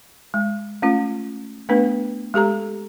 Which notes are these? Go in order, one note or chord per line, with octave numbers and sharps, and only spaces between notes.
G#3
A3 C#4 F4
A3 B3 D4 B4
G#3 G4 A4 A#5